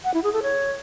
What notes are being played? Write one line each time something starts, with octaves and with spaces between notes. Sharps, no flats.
F#5
E4
G#4
A4
C#5